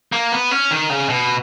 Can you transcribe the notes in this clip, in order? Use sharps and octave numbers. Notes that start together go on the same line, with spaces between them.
A#3
B3
C#4
D#3
C#3
B2